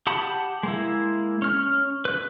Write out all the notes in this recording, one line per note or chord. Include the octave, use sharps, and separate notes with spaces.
G4 F#5 A5 B5 D#6
G#3 A#3 E4
C#4 F6
B4 F#6